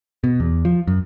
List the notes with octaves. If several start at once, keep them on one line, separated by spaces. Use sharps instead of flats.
B2
E2
F3
F#2